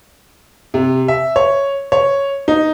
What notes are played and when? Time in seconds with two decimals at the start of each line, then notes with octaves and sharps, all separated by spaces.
0.74 C3
1.08 E5
1.36 C#5
1.92 C#5
2.48 D#4